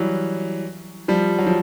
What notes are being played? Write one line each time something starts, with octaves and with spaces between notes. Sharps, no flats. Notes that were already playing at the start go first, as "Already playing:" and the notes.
Already playing: E3 F#3 G3
F3 G3
F#3
F3